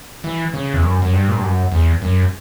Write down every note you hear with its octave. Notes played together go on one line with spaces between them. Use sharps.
E3
C#3
E2
F#2
F#2
G2
A#2
G2
F#2
E2
F#2